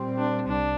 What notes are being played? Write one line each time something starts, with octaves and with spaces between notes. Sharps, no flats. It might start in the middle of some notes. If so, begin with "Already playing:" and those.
Already playing: A#2 G3 C4
D4
C2 D4